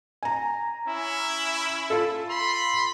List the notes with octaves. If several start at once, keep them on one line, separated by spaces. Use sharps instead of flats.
G#5 A#5
C#4 E4
F4 A4
B5 C6